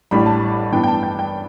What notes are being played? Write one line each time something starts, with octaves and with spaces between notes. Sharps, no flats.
A1 A2 G3 D4 B5
A5
G2 E3 B3 D4 G5
G5
A5
G5
G5